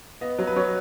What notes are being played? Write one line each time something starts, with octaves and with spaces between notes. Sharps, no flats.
B3 D#5
F#3
B4
F#3 C#5